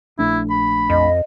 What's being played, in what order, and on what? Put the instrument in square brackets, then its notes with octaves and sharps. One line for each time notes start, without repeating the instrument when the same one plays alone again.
[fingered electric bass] A#1 A3 D4 [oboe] E4
[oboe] B5
[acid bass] F2 [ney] D#5